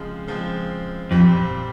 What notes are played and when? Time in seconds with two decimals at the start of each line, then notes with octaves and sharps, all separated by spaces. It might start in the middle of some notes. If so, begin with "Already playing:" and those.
Already playing: C#3 F3 G#3 C4
0.27 C#3 F3 G#3 C4
1.11 F2 A#2 G3 C4 G4